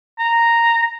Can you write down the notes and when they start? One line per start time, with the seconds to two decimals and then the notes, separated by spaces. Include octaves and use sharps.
0.19 A#5